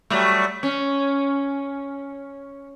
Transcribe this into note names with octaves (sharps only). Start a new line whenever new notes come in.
F#3 G3 A3
C#4